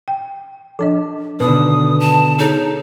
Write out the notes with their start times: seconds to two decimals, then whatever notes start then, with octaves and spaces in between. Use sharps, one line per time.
0.08 G5
0.79 F3 D4 A4 D#5
1.40 B2 D3 D#3 B4 D#6
2.00 A5
2.38 D#4 G#4 A4 C#5